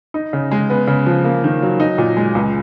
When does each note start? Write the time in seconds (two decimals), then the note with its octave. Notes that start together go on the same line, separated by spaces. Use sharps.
0.14 D#4
0.33 C#3
0.51 G#3
0.70 B3
0.87 C#3
1.06 F3
1.25 A#3
1.44 D#3
1.62 F#3
1.80 D#4
1.98 A#2
2.17 G#3
2.35 C#2